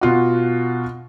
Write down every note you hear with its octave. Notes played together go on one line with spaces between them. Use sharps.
B2 F4 F#4